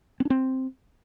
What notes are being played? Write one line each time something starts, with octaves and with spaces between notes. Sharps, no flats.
C4
D4
C4